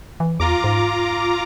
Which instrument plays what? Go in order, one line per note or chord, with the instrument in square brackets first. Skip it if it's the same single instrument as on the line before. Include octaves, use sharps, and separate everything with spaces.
[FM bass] E3
[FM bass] E2 [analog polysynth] F4 A#5 D6
[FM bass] G#2